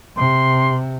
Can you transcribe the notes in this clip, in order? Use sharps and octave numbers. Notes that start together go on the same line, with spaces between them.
C3 C6